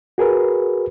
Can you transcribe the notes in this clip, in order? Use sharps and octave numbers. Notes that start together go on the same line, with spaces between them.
F#4 G#4 A#4 B4